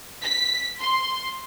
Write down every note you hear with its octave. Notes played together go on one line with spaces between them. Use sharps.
B6
C6